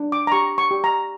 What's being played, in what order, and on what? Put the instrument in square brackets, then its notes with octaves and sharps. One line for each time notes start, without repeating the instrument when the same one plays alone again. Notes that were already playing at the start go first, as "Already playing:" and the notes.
Already playing: [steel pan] D4
D6
A#5
G4 C#6
C#6
G4
A#5